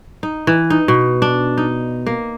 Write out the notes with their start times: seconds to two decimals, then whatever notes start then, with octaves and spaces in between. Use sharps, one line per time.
0.23 D#4
0.47 E3
0.70 D#4
0.88 B2
1.22 D4
1.58 D#4
2.06 A#3